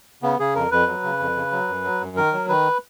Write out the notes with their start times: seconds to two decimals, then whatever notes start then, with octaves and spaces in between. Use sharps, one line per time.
0.23 C#3 B3
0.39 C#3 G#4
0.55 F2 A#4
0.71 F2 B4
0.87 F#3
1.03 C#3
1.20 F2
1.36 C#3
1.52 F#3
1.68 F#2
1.84 F#3
2.01 F#2
2.17 D#3 A#4
2.33 F#3
2.49 D#3 B4